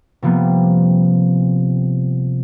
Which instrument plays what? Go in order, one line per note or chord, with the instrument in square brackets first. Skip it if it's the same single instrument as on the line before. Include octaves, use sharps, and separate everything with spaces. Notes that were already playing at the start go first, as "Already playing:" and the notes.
[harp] C3 F3 G3 A#3 B3